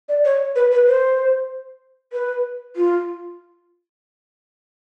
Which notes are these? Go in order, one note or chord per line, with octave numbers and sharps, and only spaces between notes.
D5
C#5
B4
B4
C5
B4
F4